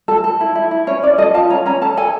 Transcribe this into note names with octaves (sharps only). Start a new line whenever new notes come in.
A4
A4
E4
E4
E4
C#4 C#5
C#4 D5
A4 D#5
F4 A5
C#4 A#5
C#4 A#5
A4 A5
A4 G#5